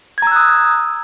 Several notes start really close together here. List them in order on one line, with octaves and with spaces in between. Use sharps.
G#6 A#5 E6 F#6 D#6